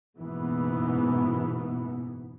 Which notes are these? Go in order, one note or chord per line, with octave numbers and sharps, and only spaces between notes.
F#1 G#2 B2 E3 B3